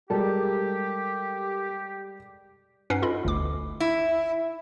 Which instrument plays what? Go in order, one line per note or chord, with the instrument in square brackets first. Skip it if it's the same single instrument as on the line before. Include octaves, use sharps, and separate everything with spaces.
[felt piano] G3 G#3 [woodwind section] G4 [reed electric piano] A4 A#4 A5
[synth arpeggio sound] G2 C#4 D#4 B4 F#5 C7
F4 A4 D#5 B5
G1 D2 D6
[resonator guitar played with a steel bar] E4